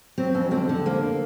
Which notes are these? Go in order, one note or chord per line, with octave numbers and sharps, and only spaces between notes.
F#3 C4
F2 C#4
D3 C4
D3
F2 A#3